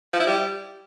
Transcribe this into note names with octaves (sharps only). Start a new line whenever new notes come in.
F3
E4
G3